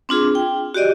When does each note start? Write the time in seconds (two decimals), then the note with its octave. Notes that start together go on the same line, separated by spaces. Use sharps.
0.09 C4 D4 F4 G#4
0.35 G5
0.74 F#4 G4 D5 D#5